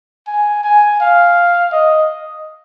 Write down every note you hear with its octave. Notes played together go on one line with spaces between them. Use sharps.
G#5
G#5
F5
D#5